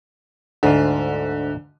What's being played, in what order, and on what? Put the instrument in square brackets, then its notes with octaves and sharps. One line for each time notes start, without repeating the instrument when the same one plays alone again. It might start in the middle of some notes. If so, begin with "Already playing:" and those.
[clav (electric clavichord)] D2 G#2 F4 [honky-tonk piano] D3